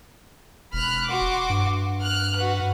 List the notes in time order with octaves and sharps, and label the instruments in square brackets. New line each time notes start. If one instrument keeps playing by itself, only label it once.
[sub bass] E1 [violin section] B5 F6 F#6
[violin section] F#4 C6 D6
[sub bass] G2
[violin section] F6 F#6
F#4 B4